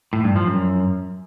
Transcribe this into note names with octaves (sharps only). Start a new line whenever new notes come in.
A2
G2
F3
F#2